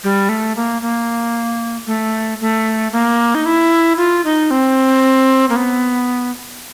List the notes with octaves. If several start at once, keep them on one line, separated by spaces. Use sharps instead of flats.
G3
A3
A#3
A#3
A3
A3
A#3
D#4
E4
F4
D#4
C4
A#3
B3